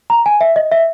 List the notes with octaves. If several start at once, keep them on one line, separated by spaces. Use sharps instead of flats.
A#5
G#5
E5
D#5
E5